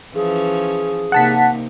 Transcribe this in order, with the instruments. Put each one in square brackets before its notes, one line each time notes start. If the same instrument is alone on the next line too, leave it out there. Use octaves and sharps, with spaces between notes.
[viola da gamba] E3 F3 C#4 [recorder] G#4
[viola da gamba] C3 A#3 D#4 [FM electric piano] F#5 A5 B6